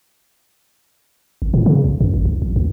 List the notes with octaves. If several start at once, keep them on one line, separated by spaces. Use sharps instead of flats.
F#1
A2
C#3
B1
F#2
G#1
C2
A#1
D2